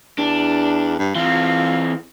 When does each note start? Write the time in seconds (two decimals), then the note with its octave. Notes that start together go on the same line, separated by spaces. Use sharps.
0.18 E2 D4
0.99 G2
1.15 E3 C4 F4